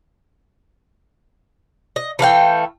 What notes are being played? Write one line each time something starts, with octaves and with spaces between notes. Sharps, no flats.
D#5
E3 A3 F5 G5